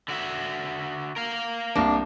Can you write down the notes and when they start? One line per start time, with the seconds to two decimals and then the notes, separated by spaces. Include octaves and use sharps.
0.08 D3 F#4 E5
1.16 A#4 F5
1.75 C2 A#3 D4